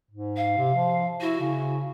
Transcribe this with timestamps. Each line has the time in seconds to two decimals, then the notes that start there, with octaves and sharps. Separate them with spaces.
0.11 G#2
0.37 F5
0.57 C3
0.75 F3
1.21 E4 F#4
1.40 C#3